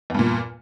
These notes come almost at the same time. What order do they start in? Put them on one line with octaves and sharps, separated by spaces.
E2 G2 A#2